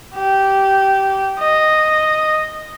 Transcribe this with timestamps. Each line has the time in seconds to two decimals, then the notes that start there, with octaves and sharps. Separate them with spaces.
0.15 G4
1.39 D#5